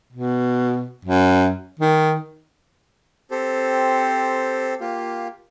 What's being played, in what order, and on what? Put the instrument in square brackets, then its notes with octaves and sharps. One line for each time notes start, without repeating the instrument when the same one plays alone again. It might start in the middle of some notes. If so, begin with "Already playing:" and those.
[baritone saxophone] B2
F#2
D#3
[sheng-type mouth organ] C4 G4 A4 C5
A#3 F4 G4